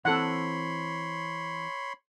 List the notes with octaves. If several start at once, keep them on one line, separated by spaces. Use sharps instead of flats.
E3 C4 A4 C#5 F#5 B5 C6